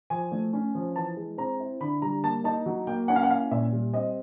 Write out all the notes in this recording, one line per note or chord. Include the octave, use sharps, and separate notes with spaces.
F3 G#5
A3
C#4
F3
E3 A5
G#3
C4 A#5
E4
D3 B5
G3 A#5
A#3 A5
D#4 A5
F#3
A#3 G5
C#4 F#5
F5
F#5
E4 F5
A#2 E5
G3
C4 D#5